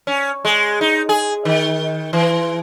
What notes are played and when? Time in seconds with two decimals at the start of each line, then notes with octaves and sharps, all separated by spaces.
0.07 C#4
0.45 G#3
0.81 D#4
1.09 G#4
1.45 D#3
2.13 E3